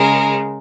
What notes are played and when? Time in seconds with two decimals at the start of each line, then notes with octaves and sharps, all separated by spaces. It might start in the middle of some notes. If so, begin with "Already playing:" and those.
Already playing: C#3 G#3 A#4